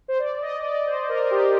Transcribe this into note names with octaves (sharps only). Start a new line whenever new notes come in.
C5
D5
D#5
D5
C5
A#4
G4